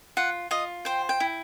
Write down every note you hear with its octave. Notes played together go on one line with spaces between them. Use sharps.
F4 F#5
F4 D#5
C5 G5
G5
E4